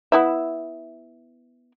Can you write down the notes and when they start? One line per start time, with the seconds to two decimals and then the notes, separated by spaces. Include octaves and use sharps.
0.12 B3 E4 E5